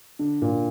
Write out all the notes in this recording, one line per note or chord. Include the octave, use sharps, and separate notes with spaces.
D3
A#2